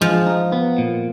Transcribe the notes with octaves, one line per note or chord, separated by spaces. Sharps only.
F3 G#3
D#4
B3
A#2